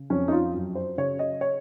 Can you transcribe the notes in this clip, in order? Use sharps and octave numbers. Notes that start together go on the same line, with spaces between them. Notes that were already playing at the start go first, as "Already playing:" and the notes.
Already playing: C#3
F2 C#4
D#4
F4
F#2
C5
C#3 C#5
D#5
C#5